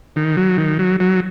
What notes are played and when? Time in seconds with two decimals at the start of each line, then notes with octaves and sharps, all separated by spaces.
0.16 D#3
0.37 F#3
0.58 D#3
0.79 F#3
1.00 F#3